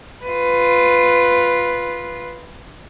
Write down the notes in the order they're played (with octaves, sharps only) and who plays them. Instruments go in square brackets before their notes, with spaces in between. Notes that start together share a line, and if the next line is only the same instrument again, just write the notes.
[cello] F4 B4